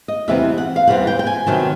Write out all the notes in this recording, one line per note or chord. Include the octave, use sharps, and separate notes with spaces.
D#5
E2 C3 E3 G3 C4 E5
F#5
F5
E2 C3 E3 G3 C4 F#5
G5
G5
G#5
C3 D#3 F#3 B3 A5